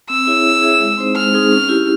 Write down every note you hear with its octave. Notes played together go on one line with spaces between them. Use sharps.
C4 E6
E4 G#4 C#5 E5
C4
E4 G#4 C#5 E5
G#3
C4 D#4 G#4 C5
G#3 F6
C4 D#4 G#4 C5
C#4
E4 G4